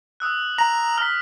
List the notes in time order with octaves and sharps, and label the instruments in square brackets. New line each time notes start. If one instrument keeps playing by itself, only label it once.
[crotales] D#6 E6 F#6
[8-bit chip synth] A#5
[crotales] F6 B6